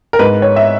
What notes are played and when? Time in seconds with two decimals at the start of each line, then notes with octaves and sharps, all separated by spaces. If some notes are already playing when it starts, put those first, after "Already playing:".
0.13 A#4
0.19 G#2 B4
0.42 C#5
0.56 E5